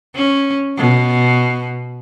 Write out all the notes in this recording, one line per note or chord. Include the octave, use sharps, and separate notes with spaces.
C#4
B2